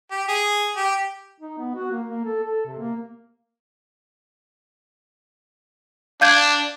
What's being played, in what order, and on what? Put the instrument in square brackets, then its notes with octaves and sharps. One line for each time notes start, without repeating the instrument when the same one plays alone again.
[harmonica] G4
G#4
G4
[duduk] D#4
B3
F#4
A#3
A#3
A4
A4
C3
A#3
[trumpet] D4 [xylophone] F5 G6 G#6